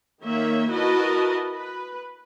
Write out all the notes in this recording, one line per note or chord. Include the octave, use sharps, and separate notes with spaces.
D#3 A#3 C#5 E5
E4 F#4 A#4 B4 D#5 A5
B4